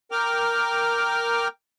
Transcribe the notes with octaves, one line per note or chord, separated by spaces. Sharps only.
A#4 G5 D6 F6